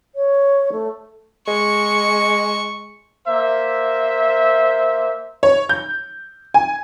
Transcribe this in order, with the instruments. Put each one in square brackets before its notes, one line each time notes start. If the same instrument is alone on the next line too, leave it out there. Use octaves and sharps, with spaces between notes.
[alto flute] C#5
A3
[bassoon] G#3 [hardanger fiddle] C#6
[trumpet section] A#3 C5 E5
[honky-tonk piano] C#5
G6
G#5